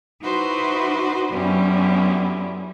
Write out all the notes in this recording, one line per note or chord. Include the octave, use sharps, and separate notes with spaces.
D#4 E4 F#4 B4 C5
F#2 D3 G3 B3 C#4 E4